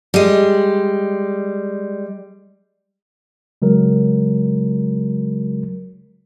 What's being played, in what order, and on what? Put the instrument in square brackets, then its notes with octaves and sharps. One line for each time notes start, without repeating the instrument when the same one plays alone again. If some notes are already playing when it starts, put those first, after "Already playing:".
[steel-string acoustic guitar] G3 G#3
[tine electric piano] C#3 F#3 G#3 A#4